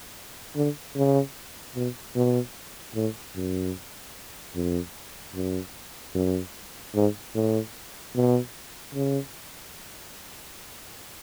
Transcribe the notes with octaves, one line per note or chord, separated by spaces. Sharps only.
D3
C#3
B2
B2
A2
F#2
F2
F#2
F#2
G#2
A2
B2
C#3